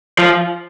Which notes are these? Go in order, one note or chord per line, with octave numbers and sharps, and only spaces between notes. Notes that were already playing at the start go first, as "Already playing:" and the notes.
F3